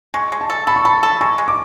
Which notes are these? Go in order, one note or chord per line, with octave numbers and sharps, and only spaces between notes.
G#3 C#6
G#3
A5
A4
A4 B5
C#6
A4 B5
A4
G#3 C#6
G#3
D6